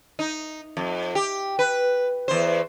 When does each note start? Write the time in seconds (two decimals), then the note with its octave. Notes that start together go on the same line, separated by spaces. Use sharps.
0.19 D#4
0.77 F2
1.15 G4
1.59 B4
2.28 E2 C5